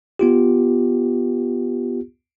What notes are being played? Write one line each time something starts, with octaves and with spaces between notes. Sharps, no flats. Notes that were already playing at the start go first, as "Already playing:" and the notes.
B3 F4 G4